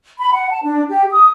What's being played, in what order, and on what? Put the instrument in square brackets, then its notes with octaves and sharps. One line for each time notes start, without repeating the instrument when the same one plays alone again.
[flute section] B5
F#5
A5
D4
G4
D#6